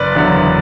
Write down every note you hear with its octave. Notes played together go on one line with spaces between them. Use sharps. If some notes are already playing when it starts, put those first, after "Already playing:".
Already playing: F#1 B4 D5
E2 D3 F#3